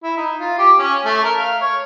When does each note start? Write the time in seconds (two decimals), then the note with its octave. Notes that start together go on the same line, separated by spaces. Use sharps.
0.03 E4
0.17 D#4
0.39 F4
0.59 G4
0.79 C#4
1.05 A3
1.24 A#4
1.38 F5
1.61 C#5